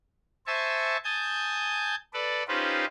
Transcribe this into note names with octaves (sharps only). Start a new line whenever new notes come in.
C5 E5 G#5 A5 C#6
G#5 A5 D#6 G6
A4 B4 D5
C#4 D#4 F4 G4 B4 C5